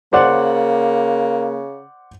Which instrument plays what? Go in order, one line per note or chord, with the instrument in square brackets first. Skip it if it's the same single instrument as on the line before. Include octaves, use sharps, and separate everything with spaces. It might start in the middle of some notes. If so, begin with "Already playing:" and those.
[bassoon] C#3 [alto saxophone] A#3 [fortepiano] C5 D5 F#5